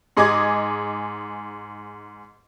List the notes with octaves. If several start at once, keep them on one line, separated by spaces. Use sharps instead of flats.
G#2 G#4 D#5 D6 G#6